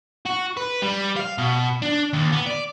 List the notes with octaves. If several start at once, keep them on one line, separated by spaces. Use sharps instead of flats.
F#4
B4
G3
F5
B2
D4
D#2
B3
D5